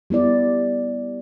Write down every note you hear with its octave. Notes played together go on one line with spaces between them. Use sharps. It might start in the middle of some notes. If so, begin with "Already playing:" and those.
G3 B3 E4 D5